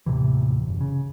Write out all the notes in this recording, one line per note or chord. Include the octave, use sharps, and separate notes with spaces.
D#2 A2 C3 E3
F#1
C#3